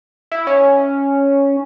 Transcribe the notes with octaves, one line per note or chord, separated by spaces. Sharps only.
E4
C#4